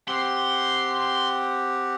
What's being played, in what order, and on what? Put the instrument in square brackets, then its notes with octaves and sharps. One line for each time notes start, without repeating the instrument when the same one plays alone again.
[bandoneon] C4 G4 F#5 [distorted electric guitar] C6